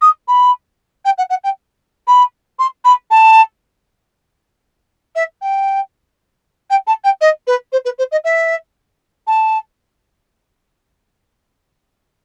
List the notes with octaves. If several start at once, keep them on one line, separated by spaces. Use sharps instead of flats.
D#6
B5
G5
F#5
F#5
G5
B5
C6
B5
A5
E5
G5
G5
A5
G5
D#5
B4
C5
B4
C5
D#5
E5
A5